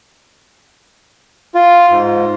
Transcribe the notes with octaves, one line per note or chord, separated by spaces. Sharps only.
F4
G#2